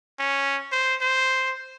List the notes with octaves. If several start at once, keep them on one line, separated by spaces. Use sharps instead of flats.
C#4
C5
C5